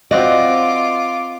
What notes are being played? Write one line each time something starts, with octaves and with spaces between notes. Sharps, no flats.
C4 F4 F#4 D5 D#5 D6